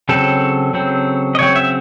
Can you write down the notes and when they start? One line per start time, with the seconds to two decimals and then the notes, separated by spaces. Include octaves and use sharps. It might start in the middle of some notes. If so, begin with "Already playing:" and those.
0.09 C#3 F#3 C4 A4
0.74 C#3 F#3 C4
1.35 D#5
1.39 C#3 F#3 C4 C#5
1.56 E5